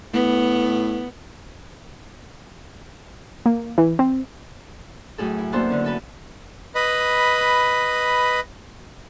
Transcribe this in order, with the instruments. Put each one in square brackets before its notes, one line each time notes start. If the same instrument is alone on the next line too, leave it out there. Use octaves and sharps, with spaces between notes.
[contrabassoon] A2 [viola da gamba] B3
[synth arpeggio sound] A#3
E3
C4
[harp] F#2 A2 G#4 A4
E4
A#3 B3 D4 F#4 A4 C5
D3 C#4
C#4 A4 B4
[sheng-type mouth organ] B4 D#5 B5